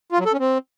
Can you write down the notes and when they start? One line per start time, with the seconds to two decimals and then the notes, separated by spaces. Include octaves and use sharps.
0.12 F4
0.19 F#3
0.26 A4
0.33 C#4
0.40 C4